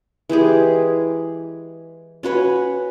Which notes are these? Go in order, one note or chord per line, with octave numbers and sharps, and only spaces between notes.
E3 G#3 G4 G#4
C#4 F#4 B4 C#5